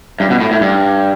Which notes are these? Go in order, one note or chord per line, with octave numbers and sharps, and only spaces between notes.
G2
B2
A2
A2
G2